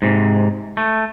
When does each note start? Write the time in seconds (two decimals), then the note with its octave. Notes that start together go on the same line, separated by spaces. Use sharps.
0.02 G#2 C3
0.77 A3